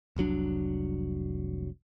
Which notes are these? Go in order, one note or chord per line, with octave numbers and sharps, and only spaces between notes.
F1 C2 F#3 D4